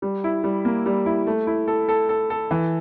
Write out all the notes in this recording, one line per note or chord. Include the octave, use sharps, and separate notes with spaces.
G3
E4
G3
A#3
G3
E4
A3
E4
A4
A4
A4
A4
E3